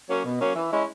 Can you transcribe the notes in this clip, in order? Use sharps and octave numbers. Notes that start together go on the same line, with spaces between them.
F#3 A#3 C#4
B2
F#3 A#3 C#4
E3
G#3 C#4 E4